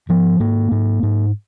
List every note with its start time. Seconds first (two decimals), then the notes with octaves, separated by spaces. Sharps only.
0.09 G#2 F3
0.40 G#2 A#3
0.72 G#2
1.03 G#2